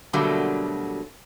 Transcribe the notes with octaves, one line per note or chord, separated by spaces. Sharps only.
B2 D3 F#3 G3 A3 A#3